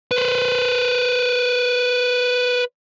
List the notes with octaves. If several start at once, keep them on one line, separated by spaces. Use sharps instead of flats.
B4 C5